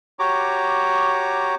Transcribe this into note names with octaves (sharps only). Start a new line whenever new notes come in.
F#4 G4 C#5 A#5 D6